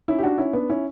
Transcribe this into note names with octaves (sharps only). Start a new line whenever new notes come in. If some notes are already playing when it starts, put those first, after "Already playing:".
C#4 E4
G4
D4 F#4
C#4 E4
B3 D4
C#4 E4